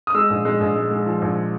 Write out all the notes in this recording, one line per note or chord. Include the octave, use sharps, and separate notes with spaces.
D#6
G#3 E6
A#1
G#3
A#1
G#3
G#3
F3
A#1